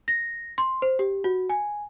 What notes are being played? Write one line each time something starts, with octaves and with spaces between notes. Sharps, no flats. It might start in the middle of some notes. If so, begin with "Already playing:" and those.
A#6
C6
C5
G4
F#4
G#5